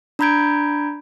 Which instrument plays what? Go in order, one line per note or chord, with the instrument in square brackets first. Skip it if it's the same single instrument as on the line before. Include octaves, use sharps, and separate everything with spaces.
[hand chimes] D4 A#5 B5 G6 G#6 D7